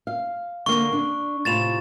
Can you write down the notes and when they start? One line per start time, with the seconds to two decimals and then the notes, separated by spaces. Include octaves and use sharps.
0.07 F5
0.66 D3 A#3 C#6
0.93 D4
1.45 A2 C3 F4 A6 E7 F7